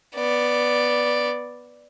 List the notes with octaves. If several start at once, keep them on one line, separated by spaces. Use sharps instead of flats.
B3 D5